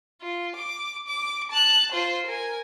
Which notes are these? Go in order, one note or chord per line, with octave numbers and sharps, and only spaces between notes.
F4
D6
D6
A5 F#6
F4 C5
A#4 G#5